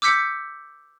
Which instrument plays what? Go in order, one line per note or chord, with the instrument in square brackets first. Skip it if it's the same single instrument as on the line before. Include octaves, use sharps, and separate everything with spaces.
[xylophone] D6 E6 G6 B6 C#7